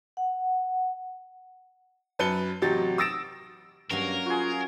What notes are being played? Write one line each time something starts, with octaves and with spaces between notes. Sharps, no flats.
F#5
F#2 B4 A5 C#7 G7
A1 C3 F#3 G4 A6
D#6 E6 A6 A#6 D7 E7
G2 F#3 A#3 C#4 A#4
F4 F#4 G#4